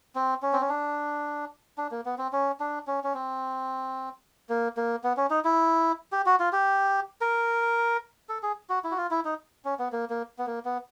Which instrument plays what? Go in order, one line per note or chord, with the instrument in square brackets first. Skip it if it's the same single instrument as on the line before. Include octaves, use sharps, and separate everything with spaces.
[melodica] C4
C#4
C4
C#4
D4
D4
A#3
B3
C4
C#4
D4
C#4
C#4
C4
A#3
A#3
B3
C#4
D#4
E4
G4
F#4
F4
G4
A#4
A4
G#4
F#4
E4
F#4
F4
E4
D#4
C#4
B3
A#3
A#3
B3
A#3
B3